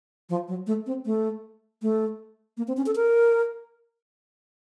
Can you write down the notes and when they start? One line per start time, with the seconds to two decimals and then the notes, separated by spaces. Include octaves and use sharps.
0.29 F3
0.48 F#3
0.67 A3
0.86 C4
1.05 A3
1.82 A3
2.57 A#3
2.68 C4
2.77 C#4
2.86 A4
2.96 A#4